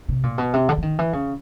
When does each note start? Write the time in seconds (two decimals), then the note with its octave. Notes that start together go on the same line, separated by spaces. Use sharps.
0.08 C3
0.23 A#2
0.38 B2
0.54 C3
0.69 D3
0.77 E3
0.82 D#3
0.99 E3
1.13 C#3